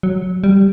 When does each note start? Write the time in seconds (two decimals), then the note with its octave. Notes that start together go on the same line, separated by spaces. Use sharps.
0.03 F#3
0.44 G3